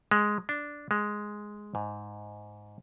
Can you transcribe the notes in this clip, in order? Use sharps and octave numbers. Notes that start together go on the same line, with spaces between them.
G#3
D4
G#3
G#2